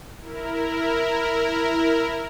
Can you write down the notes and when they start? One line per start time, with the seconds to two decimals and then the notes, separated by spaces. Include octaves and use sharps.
0.20 E4 A#4